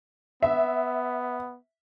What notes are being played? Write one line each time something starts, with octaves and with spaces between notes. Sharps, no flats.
B3 E5